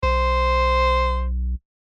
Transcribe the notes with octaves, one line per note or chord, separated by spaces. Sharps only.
B1 C5